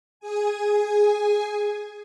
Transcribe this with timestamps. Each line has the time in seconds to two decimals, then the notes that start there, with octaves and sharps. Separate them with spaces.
0.20 G#4 G#5